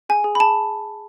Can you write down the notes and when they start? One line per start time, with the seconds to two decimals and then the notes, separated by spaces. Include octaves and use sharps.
0.09 G#4 G#5
0.24 G#4
0.35 B5
0.40 G#4 A5